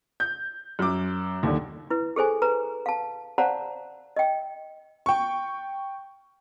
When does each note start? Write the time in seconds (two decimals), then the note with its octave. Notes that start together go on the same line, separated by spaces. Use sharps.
0.20 G6
0.79 F#2 D6
1.43 D#2 D3
1.90 E4 B4
2.16 G#4 A4 C5 G#5
2.42 B4 A#5
2.86 F5 A5
3.38 C5 D5 F5 F#5 A5 A#5
4.16 D#5 G5
5.06 G5 C#6